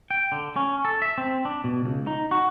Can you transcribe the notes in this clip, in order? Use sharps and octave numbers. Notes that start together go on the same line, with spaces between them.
G5
D3
C#4
A4
E5
C4
D4
B2
C#2
D#4
F#4